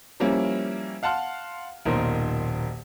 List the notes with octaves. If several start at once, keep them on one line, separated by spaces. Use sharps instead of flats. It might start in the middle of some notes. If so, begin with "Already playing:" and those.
F3 G3 A#3 C#4 E4
F5 F#5 A5 C6 F6
D#1 B1 A#2 D#4 A#4 C5